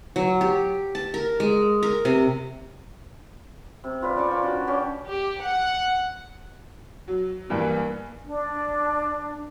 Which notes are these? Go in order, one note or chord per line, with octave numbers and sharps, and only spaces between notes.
F#3
G4
A5
A#4
G#3
A#4
C3
C3
F4 B4 D5
C#4 D5 A5 C#6
F4 D5 G5
C#4 D4 F#4
C#4 G4 D5 C#6
G4
F#5
F#3
G2 E3 A#3
D4